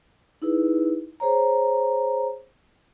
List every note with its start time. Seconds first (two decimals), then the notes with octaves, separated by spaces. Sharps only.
0.42 D#4 E4 G#4 B4
1.20 G#4 C5 C#5 A#5